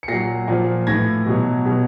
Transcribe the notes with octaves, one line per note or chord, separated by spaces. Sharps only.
C#7
A#2 F#3 A#6 C7
A#2 F3
A2 E3 G#6 A#6
B2 F#3
B2 F#3